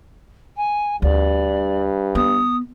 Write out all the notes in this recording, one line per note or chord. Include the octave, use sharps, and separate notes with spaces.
G#5
D2 G2 D5
B3 D#6